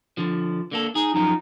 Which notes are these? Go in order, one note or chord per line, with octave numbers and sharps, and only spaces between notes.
D3 F3
D3 A#3 A4
D#4 G#4
F#2 F3 D#4